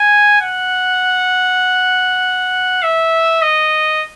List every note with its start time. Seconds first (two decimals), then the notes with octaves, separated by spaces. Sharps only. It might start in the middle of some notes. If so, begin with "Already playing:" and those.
Already playing: G#5
0.41 F#5
2.83 E5
3.42 D#5